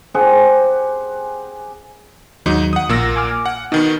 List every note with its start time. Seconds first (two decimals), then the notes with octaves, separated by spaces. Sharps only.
0.14 G4 G#4 C5 F#5
2.46 D#2 G#2 F#3 D#4
2.73 F#5 D#6
2.89 A#1 A#2 A#3 E6 A#6
3.16 G#5 D6 F6
3.46 F#5
3.72 B2 D#3 B3 D#4